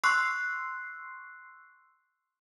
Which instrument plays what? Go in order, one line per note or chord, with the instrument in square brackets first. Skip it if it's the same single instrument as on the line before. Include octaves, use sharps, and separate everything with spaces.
[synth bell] C6 C#6 E6 F#6 C7